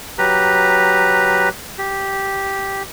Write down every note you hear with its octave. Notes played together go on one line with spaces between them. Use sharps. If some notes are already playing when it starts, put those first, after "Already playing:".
F#3 G4 B4 A#5
G4